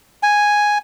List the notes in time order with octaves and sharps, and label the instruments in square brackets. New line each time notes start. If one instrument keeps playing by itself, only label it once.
[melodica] G#5